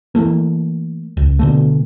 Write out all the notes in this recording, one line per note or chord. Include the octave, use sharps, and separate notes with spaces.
E3 F#3 A3 A#3
C#2
B2 D3 A3